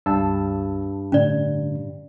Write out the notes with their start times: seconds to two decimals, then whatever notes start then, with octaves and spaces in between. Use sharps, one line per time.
0.06 C#2 G2 A5 E6
1.12 A2 D3 C#4 D5